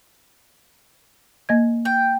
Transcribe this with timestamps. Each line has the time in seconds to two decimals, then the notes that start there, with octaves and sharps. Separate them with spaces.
1.49 A#3 D#5 G#6
1.85 G5